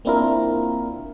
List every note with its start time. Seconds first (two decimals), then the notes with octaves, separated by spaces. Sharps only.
0.05 A#3 C4 D4 E4 F4 A#4